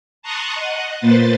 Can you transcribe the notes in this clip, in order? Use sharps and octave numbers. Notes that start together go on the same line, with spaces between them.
A5 A#5 C6 C#6 D#6 F#6
D#5 F#5
A#2 A#3 B4 C5 A6